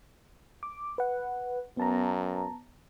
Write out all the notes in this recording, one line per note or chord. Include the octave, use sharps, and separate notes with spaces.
D6
B4 F#5
F#2 B3 A5 A#5